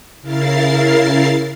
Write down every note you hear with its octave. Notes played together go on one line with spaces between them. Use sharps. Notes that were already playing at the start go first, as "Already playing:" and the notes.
C#3 E4 A#4 F5 A6 C7